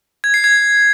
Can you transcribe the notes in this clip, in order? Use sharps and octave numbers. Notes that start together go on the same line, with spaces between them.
G#6
C7
G#6